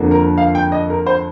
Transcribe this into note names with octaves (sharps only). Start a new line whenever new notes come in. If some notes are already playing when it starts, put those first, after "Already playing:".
Already playing: F2 D3 F3 A#3
A#4
F5
G5
D#5
A#4
C5